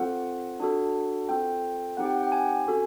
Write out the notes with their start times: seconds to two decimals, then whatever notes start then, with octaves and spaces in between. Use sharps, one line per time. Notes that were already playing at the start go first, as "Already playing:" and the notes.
Already playing: C4 F4 A4 F#5
0.60 D4 F#4 A4
1.29 C4 F4 A4 G5
1.97 C4 D#4 G4 F#5
2.06 G5
2.15 F#5
2.23 G5
2.32 G#5
2.66 C#4 F#4 A4